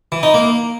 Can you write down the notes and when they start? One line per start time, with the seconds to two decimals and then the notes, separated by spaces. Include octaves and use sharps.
0.12 E3
0.23 D#4
0.34 A#3